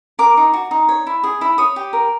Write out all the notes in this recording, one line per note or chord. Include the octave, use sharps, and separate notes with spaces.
A#4 D6
D#4
F#4
D#4
C#5
E4
G#4
E4
C#5 D#6
G4
A#4